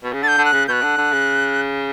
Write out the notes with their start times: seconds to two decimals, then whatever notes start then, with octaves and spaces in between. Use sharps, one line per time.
0.03 B2
0.13 C#3
0.23 D3 A6
0.28 G6
0.38 D3
0.45 F#6
0.52 C#3
0.68 B2 F#6 G6
0.82 D3
0.97 D3
1.12 C#3